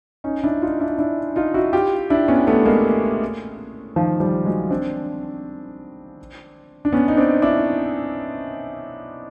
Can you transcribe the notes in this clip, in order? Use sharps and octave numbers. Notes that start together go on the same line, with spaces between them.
C#4 D#4
D4 E4
D#4 F4
D4 E4
D4 E4
D#4 F4
E4 F#4
F4 G4
D4 E4
B3 C#4
A3 B3
G#3 A#3
D#3 F3
F3 G3
F#3 G#3
C4 D4
D4
B3 C#4
D#4
C4 D4
D4 E4